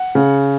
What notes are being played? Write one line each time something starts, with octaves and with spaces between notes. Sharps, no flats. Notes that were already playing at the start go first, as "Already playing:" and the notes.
Already playing: F#5
C#3